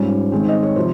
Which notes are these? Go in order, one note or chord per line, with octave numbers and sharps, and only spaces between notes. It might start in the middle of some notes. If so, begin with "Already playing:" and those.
Already playing: G#2 G3 C#4 F4 C#5
D#3 G#3 C4
D#5
C#5
C3 F3 C5